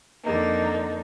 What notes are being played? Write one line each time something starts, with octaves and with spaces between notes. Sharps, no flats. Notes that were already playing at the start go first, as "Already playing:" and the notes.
F2 D3 A#3 D#4